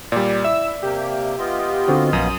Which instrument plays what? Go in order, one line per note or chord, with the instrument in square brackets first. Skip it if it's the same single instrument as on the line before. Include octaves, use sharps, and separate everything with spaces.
[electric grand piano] A#2 G3 [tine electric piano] D5
[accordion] E4 [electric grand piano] E5 [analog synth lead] E6
[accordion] C3 A#3 [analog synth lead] G4
[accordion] B3 F4 D#5
[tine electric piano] D3 C4 F#4
[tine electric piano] A#1 [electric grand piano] F#2 [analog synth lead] D#6